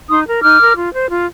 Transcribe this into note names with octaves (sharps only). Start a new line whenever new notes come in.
D#4 C6 D#6
A#4
D#4 D6 F6
A#4
F4
C5
F4